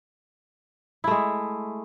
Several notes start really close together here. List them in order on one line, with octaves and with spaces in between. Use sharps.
E4 A3 G#3